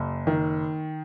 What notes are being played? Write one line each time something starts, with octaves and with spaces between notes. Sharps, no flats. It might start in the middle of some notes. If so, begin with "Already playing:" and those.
Already playing: F#1
D#3